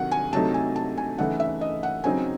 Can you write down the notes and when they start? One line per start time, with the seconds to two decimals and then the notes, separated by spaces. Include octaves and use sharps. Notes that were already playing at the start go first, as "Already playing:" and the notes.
Already playing: C3 D#3 F#3 F#5
0.12 G#5
0.33 C3 F#3 A3 D#4 A5
0.54 G#5
0.76 A5
0.98 G#5
1.18 C#3 E3 A3 D#4 F#5
1.40 E5
1.61 D#5
1.83 F#5
2.04 C#3 F#3 C4 D#4 G#5